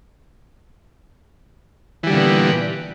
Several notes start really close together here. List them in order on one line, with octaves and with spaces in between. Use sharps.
E3 G3 D3 A#2 B3